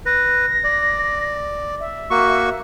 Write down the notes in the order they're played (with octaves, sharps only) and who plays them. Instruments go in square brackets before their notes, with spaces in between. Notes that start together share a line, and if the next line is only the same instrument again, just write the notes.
[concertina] B4 [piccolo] A#6
[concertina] D5
[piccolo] E5
[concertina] A#3 F#4 C#6